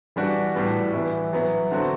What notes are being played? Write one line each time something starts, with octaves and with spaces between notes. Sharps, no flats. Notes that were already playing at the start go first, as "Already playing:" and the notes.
E3 G3 D4 F#4
A2 G3 B3
E3 B3 E4
F#3 B3 E4
D3 F#3 C4 F#4